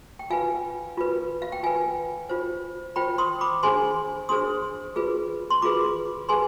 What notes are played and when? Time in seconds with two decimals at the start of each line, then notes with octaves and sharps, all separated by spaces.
0.19 G5
0.30 F4 B4 F5 G#5
0.98 F4 B4
1.42 F5
1.52 G5
1.63 F4 B4 F5 G#5
2.29 F4 C5
2.96 F4 C5 G5 B5
3.18 C6 D#6
3.41 B5 D6
3.63 D4 G#4 C5 G#5 C6
4.29 D4 G#4 C5 C6 D#6
4.96 F4 G#4 B4
5.50 C6
5.62 F4 G#4 B4 B5 D6
6.29 G#4 B4 G#5 C6